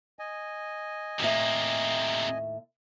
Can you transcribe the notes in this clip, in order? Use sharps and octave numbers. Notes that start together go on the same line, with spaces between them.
D#5 G#5
D#2 A2 C3 A#3 E5